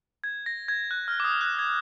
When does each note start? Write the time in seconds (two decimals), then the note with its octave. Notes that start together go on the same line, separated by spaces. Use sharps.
0.24 G#6
0.46 A#6
0.68 G#6
0.91 F#6
1.08 F6
1.20 D6
1.24 D#6
1.41 F#6
1.59 G#6